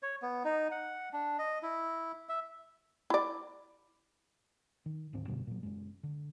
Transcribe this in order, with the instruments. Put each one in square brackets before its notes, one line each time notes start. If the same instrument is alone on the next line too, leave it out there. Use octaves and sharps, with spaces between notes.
[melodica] C#5
B3
D#4
F#5
D4
D#5
E4
E5
[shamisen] E4 D5
[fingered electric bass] D#3
D#1 D2 G#2 C4
F#2 B2 D3 G3
A#2 F#3
F#1 F#2 G#3
D3